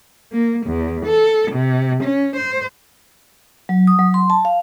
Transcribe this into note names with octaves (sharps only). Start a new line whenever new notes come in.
A#3
E2
A4
C3
C#4
C5
F#3
D#6
F#3
C6
A5
F5